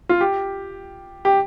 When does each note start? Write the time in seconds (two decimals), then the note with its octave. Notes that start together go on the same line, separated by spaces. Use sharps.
0.09 F4
0.21 G4
1.25 G4